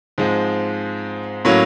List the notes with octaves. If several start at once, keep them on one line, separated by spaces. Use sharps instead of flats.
G#2 F3 G#3 C4
A2 F#3 A#3 C#4